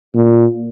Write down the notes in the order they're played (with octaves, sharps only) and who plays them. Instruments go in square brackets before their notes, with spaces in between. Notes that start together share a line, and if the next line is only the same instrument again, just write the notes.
[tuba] A#2